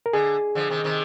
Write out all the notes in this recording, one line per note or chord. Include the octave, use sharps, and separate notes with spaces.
A#4
D3 G#4
D3 F3
C3 D#3
C3 D#3